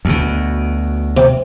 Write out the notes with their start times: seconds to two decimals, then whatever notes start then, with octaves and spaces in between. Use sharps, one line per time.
0.05 D2 B2
1.17 C3